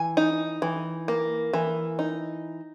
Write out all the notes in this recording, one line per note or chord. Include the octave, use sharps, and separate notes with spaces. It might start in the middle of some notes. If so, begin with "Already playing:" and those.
Already playing: E3 G#5
D#4
E3
A#3
E3
D#4